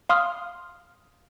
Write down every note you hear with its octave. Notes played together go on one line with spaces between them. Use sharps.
F5 C6 D#6 F6